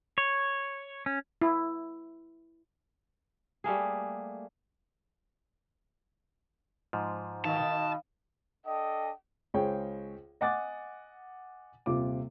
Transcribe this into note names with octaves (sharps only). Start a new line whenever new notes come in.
C#5
C#4
E4
G3 A3 A#3 G#4
G#2 F3
B2 D#3 F5 A5
D4 A4 D#5 G5
C#2 G#4 C5 C#5 G5
D#5 F#5 G#5 D6 F#6 A6
D#1 C3 F4 D6